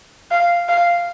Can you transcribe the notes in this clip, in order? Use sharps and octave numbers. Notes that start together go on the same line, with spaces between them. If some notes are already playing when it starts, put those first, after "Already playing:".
F5
F5